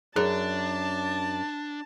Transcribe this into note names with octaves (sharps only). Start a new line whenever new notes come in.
F#2 D4 G#4 A5